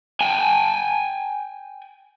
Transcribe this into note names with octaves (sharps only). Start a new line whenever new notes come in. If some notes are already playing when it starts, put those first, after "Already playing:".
G5 G#5